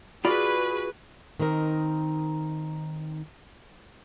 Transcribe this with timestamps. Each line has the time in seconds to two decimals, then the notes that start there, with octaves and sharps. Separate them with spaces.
0.25 F4 F#4 G#4 B4 D5 B5
1.40 D#3 C4 D#4 A#4